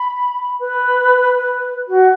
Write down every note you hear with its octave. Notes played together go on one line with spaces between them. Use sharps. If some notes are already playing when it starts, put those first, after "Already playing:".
Already playing: B5
B4
F#4